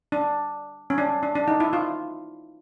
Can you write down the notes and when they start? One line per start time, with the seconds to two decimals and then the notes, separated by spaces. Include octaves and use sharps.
0.12 D4
0.90 C#4
0.98 D4
1.23 D4
1.35 D4
1.48 D#4
1.60 E4
1.73 F4